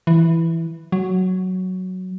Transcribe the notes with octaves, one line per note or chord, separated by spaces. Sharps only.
E3
F#3